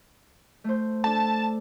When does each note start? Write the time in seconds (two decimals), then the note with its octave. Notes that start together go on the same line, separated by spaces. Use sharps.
0.64 A3 C5
1.04 D4 A4 A5